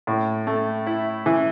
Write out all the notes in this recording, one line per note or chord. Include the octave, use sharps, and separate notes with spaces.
A2
A3
E4
E3